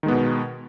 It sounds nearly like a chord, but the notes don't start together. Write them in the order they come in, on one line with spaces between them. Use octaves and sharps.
D#3 G#3 B3 B2